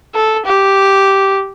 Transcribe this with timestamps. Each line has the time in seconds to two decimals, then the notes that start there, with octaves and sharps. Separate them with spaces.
0.14 A4
0.46 G4